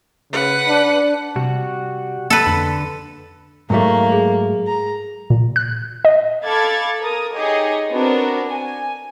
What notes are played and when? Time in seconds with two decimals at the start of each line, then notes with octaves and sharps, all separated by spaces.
0.33 C#3 B4 F#5
0.68 D4
1.36 C3 G3 F#4
2.30 A#3 A4 B4
2.47 F2 D3
3.70 G#2 F#3 A3 A#3
4.12 G#4
4.67 A#5
5.30 A#2
5.56 F#6
6.05 D#5
6.44 A4 F5 B5 D6 G#6 A6
7.01 A#4 D#6
7.35 D#4 G4 G#4 C#5 D#5
7.90 B3 C4 D4 F#4 A#4
8.48 G#5